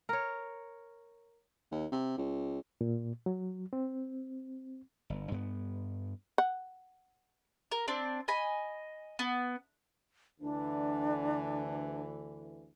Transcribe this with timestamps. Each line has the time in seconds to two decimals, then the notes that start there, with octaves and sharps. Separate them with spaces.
0.09 A#4 C#5
1.72 D#2
1.92 C3
2.18 C#2
2.81 A#2
3.26 F#3
3.73 C4
5.10 G1
5.31 G2 B3
6.38 F#5
7.72 A#4
7.88 C4 D4
8.28 D#5 G#5 B5
9.19 B3
10.41 D2 D3 E3 D4